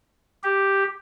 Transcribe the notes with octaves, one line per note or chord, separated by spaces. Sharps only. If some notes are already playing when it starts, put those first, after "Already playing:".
G4